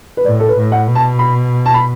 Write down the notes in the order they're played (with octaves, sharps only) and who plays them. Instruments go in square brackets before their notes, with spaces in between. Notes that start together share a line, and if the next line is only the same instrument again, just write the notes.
[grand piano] B4
[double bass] A2 [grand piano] D5
[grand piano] A4
B4
[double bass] A2
[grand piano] F#5
[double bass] B2
[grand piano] A5
B5
A5
B5